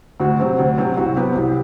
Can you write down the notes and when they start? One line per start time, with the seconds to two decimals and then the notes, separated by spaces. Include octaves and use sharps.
0.20 D2 F#4
0.39 C3 F#3 C4
0.59 D2
0.78 C3 F#3 C4
0.97 C2 F#4
1.16 C3 F#3 B3 G4
1.35 C2 G4